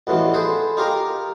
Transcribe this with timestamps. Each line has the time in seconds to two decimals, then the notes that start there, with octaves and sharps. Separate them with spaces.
0.07 A1 E2 B2 E3 F3
0.34 G#4 A4 B4 C5
0.77 D#4 F4 G4 A#4 D#5 A#5